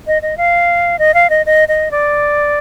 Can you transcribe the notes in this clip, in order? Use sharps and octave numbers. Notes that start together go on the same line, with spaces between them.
D#5
D#5
F5
D#5
F5
D#5
D#5
D#5
D5